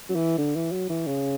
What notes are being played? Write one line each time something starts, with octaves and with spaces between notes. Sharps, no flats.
F#3
E3
D3
E3
F#3
E3
C#3